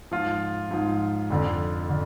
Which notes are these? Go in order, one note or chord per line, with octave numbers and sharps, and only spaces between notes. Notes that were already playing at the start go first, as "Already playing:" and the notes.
G#2 F3 F4
G#2 F3
F2 D3 F3
D3